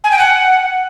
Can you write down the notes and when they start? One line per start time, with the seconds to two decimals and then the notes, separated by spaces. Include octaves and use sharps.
0.04 G#5
0.11 G5
0.19 F#5